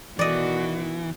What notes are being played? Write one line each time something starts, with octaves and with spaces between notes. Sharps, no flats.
B2 D#3 E3 F#4 D5 D#5